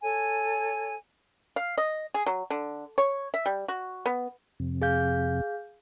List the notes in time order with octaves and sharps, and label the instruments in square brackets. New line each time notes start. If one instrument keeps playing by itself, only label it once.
[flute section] A4 C#5 G#5
[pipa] F5
D#5
G#4
F#3
D3
C#5
E5
G3
F#4
B3
[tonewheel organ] F2 C3
[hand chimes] G#4 F5 G6